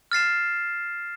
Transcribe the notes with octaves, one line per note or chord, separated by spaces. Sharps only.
F6 A6 C7 E7